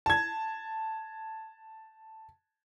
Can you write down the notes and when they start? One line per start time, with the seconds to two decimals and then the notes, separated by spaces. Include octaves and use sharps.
0.06 A5 G#6